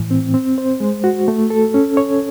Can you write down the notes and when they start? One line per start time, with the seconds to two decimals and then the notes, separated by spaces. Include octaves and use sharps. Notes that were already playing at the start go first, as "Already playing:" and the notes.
Already playing: A2 E3
0.11 C4
0.34 C4
0.58 C5
0.80 G#3
1.04 F#4
1.28 A3
1.50 A4
1.74 C#4
1.97 C#5